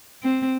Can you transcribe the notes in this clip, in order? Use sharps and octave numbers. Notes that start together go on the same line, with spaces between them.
C4